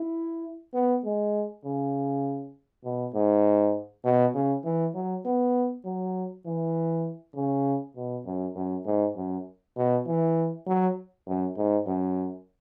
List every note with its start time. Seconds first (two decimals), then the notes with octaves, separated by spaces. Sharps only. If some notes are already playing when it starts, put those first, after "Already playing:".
Already playing: E4
0.74 B3
1.04 G#3
1.64 C#3
2.85 B2
3.14 G#2
4.05 B2
4.35 C#3
4.65 E3
4.95 F#3
5.25 B3
5.85 F#3
6.45 E3
7.35 C#3
7.96 B2
8.26 F#2
8.55 F#2
8.86 G#2
9.16 F#2
9.76 B2
10.07 E3
10.67 F#3
11.27 F#2
11.56 G#2
11.87 F#2